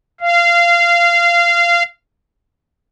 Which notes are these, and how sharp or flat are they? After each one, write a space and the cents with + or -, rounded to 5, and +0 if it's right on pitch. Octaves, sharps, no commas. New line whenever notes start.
F5 -20